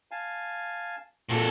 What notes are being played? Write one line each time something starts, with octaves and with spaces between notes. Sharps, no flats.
F5 G#5 A5
A#2 A#3 F#4 A4